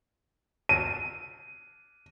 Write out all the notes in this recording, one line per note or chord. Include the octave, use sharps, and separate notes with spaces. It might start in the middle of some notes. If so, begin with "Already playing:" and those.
D#7